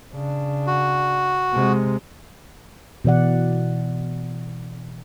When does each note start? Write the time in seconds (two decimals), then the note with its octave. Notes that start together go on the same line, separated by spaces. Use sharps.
0.13 C#3 D4
0.67 F#4
1.53 C3 G#3
3.05 B2 E3 D5 F#5